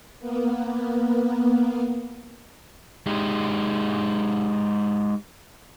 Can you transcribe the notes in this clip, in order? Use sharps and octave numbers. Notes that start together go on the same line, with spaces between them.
A#3 B3
G#3 D#4 G4